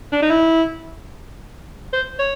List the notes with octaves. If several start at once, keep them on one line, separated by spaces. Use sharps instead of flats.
D4
D#4
E4
C5
C#5